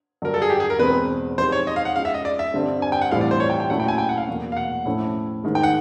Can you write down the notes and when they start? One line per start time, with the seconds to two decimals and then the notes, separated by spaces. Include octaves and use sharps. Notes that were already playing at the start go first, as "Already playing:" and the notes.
0.22 G2 D3 F#3 A#4
0.34 A4
0.42 G#4
0.50 G4
0.60 G#4
0.70 A#4
0.79 E2 B2 G#3 C4 B4
1.38 F3 G#3 C4 D#4 G4 C5
1.52 C#5
1.67 D#5
1.76 F5
1.85 F#5
1.95 G#3 C#4 F4 F5
2.05 E5
2.14 D#5
2.25 D5
2.39 E5
2.54 G2 D3 G3 C4
2.82 G#5
2.92 G5
3.02 F#5
3.11 A2 E3 G3 C4 F4 F5
3.21 D5
3.31 C5
3.40 C#5
3.50 G5
3.60 G5
3.70 A#2 F#3 A3 C#4 E4 F#5
3.80 G5
3.88 G#5
3.98 G5
4.09 F#5
4.17 F5
4.28 E2 B2 F#3 A#3
4.52 F5
4.57 F#5
4.85 A2 F3 A3 C#4 E4
5.44 G#2 D#3 G#3
5.55 G5
5.63 F#5